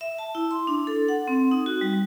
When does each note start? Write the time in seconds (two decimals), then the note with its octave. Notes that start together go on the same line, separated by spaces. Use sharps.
0.01 E5
0.19 A5
0.35 E4
0.51 C6
0.67 D4
0.87 A4
1.09 F#5
1.28 C4
1.51 D#4
1.66 F#4
1.81 G3